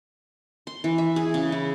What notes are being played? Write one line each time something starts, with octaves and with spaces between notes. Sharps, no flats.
C6
E3
E5
G#4
C#3
E4